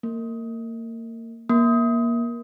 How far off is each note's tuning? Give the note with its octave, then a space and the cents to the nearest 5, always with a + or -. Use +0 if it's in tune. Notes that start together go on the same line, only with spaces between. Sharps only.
A#3 -30
A#3 +20